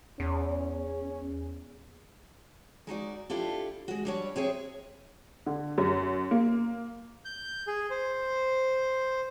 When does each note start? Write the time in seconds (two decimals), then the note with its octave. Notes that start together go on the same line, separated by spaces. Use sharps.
0.20 E2 C#4
2.87 G#3 D#4 F#4 D5
3.30 D4 E4 F4 G4 A4
3.88 G#3 F#4
4.05 G3 D4 C#5
4.36 C4 G#4 C#5 E5
5.46 D3
5.78 F#2
6.31 A#3
7.25 G6
7.67 G#4
7.90 C5